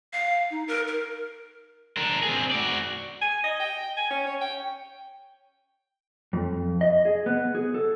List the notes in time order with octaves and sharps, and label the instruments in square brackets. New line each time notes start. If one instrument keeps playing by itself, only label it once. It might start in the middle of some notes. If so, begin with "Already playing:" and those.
[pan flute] F5
D#4
A#4
A#4
[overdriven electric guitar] D4 A#4
C4 G#4
F#4 D5
[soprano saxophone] G#5
D#5
G5
G#5
C#4
C#5
G5
[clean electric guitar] F2
D#5
G#4
B3
G#4
A4